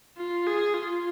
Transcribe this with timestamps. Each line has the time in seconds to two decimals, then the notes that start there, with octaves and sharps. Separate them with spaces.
0.18 F4
0.47 G#4
0.74 F4